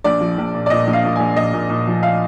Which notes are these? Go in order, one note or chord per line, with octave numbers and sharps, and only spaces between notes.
A#1 D5
F3
A#1
A#2
D5
A#2 D#5
A#1
F5
A#2
A#1 G#5
A#1 D#5
A#2
A#2
F3
F5